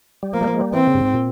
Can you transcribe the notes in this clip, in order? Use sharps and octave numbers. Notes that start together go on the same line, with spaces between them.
G3
F3 A#3
G3
F3
G#3
G3
E3 C4
C#3
G2
G#2
A#2